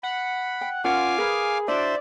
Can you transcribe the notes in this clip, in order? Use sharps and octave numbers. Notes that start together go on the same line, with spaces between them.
F#5 B5
G5
C#4 F4 A#4 F5 F#5 G#5 D6
G#4 A#4 B4
D4 E4 F#4 C5 D5 E5